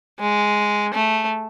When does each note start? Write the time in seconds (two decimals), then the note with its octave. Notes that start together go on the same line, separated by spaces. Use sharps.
0.20 G#3
0.94 A3